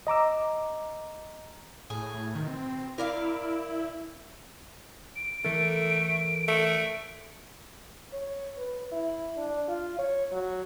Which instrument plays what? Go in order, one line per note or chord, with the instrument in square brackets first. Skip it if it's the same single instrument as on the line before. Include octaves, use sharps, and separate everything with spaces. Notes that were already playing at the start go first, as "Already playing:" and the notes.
[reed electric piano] D#5 A#5 D6 E6
[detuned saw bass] A2 [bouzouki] G#4
[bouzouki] B2 [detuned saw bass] D#3
[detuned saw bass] C4
[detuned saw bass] E4 [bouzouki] A#4 D5 F5
[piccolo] D7
[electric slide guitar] E3 A4 A#4 [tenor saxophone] A3
[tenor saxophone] A3
[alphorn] C#5
B4
E4
D4
F4
C#5
F#3